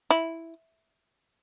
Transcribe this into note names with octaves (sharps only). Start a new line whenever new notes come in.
E4